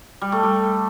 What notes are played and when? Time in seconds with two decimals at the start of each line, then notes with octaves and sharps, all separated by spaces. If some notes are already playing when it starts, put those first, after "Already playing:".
0.22 G3
0.32 A3
0.43 G3